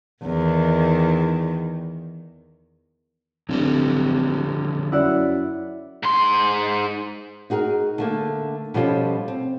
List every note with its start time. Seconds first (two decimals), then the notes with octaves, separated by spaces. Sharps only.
0.23 E2 D#3
3.49 D1 F2 D3 G3
4.92 F#2 E4 D5 F#5
6.03 G#2 C6
7.50 D#4 F#4 G#4 A#4
7.98 D3 A3 A#3
8.74 B2 F3 G3 C#4 F4 A4
9.28 C4